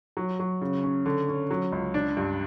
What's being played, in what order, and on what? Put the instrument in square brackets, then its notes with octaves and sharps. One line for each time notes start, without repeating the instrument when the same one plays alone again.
[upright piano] F#3
F#3
C#3
C#4
D3
C#4
F#3
C#2
D4
G2